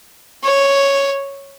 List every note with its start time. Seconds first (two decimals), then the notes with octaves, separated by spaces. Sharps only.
0.44 C#5